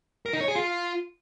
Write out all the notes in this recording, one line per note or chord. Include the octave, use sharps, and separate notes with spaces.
A#4
D#4
C#5
G#4
F4